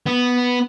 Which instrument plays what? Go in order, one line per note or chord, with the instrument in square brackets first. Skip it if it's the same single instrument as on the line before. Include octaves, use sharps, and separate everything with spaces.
[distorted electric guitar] B3